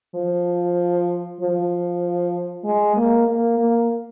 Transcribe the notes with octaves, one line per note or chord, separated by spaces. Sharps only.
F3
F3
G#3
A#3
A#3
A#3